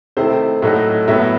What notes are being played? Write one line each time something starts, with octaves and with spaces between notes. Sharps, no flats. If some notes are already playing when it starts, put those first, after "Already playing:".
C3 D#3 A3 C4 E4 C5
A2 F#3 A3 D#4
A2 F#3 B3 E5